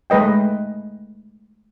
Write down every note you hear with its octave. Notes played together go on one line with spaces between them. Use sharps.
G#3 A3 B4 D#5 G5